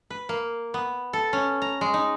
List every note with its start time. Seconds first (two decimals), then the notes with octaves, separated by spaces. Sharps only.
0.10 B4
0.29 A#3
0.74 B3
1.13 A4
1.33 C#4
1.62 A#5
1.81 G#3
1.94 D#4